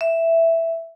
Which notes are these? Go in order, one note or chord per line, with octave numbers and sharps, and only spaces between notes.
E5